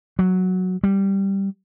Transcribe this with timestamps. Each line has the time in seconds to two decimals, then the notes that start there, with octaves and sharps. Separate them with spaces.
0.19 F#3
0.84 G3